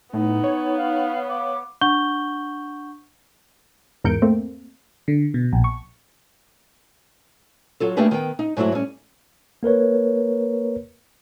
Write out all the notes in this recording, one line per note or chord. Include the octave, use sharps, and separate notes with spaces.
A2 B3 D#4
C#5
F5
F5 D6
D4 F#5 C#6 G6 G7
E2 G#2 A#4 G6 C#7 D7
A3 A#3 C4
D3
B2
A#1
C#6
F#3 F4 A4
A3 A#3 D4 G4 G#4 B4
D#3 B3 G5
D#4
G#2 F#3 A3 E4 F#4
G3 C#4
A#3 A#4 B4 C#5